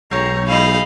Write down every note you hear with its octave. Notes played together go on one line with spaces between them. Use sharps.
B1 G3 C#5 A#5
G3 E4 G#4 D#5 F5 B5